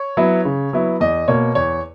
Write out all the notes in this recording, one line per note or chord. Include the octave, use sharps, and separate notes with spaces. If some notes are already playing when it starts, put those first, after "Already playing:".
Already playing: C#5
F#3 B3 E4
C#3
F#3 B3 E4
E2 D#5
B2 A#3 C#5
E2 C#5